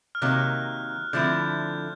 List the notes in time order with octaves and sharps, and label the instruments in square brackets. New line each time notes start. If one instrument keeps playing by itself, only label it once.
[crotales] F6
[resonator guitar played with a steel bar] C3 D#3 F#3 A#3 D#4 [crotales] F#6
[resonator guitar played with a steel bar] D3 F3 A3 C4 E4 [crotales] G6